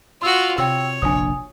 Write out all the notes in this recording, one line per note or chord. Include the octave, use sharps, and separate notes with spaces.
F4 F#4 C6 E6
C3 C#5 G5 E6
F1 A#1 D4 G#5 D#6